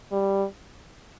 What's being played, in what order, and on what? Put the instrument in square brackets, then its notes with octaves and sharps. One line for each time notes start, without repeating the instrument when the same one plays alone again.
[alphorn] G3